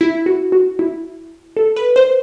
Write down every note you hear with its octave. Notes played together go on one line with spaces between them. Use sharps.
E4
F#4
F#4
E4
A4
B4
C5